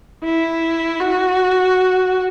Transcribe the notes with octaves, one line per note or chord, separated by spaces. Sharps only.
E4
F#4